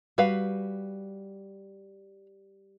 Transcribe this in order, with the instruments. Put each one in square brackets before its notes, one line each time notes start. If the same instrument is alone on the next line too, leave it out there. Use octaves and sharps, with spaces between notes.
[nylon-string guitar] G3 [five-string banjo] F#4 B4 F5